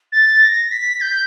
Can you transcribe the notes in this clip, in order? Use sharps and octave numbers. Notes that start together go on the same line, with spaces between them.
A6
A#6
B6
G6